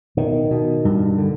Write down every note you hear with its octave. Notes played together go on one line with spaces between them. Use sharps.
B2 D#3
B2
G2
D3